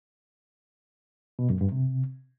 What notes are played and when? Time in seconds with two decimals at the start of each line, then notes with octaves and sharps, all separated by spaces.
1.39 B2
1.50 F#2
1.61 G2
1.72 C3